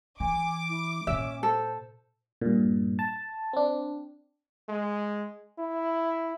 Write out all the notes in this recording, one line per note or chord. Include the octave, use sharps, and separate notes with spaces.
E3 G#5 D6
E4
A#2 C#4 F4 E5
A4 C5
G2 A#2
A5
C4 D4
G#3
E4